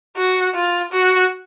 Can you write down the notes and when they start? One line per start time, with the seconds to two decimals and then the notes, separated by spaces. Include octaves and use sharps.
0.16 F#4
0.55 F4
0.92 F#4